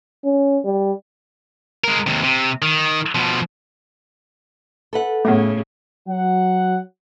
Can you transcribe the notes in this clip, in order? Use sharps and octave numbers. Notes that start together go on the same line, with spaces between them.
C#4
G3
G#3 A#4
D#2 C3
C3
D#3
B2 F3
A4 B4 F#5
A2 C#3 A3 B3
F#3 F#5